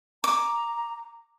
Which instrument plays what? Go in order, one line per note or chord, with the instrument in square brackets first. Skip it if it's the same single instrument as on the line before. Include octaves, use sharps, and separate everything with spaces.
[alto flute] A#5 [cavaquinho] D6